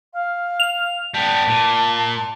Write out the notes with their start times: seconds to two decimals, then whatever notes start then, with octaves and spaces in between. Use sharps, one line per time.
0.14 F5
0.60 F7
1.14 G3 B3 A5
1.48 A#2